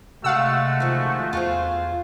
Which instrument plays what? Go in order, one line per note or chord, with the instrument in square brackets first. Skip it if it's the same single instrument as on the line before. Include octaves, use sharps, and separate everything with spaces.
[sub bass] C3 [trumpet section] G#3 A3 F#4 [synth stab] F5 F#5 E6
[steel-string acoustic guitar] D#3 F3
[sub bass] E2 [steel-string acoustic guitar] F4 G#4 C5